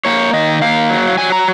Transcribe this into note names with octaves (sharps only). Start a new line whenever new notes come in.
A#3 C#5
D#3 D#5
A#3 F5
F#3
F#3 G#5
A#5